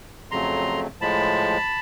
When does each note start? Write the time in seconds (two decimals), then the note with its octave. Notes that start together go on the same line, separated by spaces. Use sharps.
0.31 F2 C#3 F#3 A3 A#5 C6
1.01 A2 F3 G#3 A5 B5